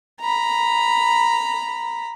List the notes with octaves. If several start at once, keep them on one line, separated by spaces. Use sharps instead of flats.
A#5 B5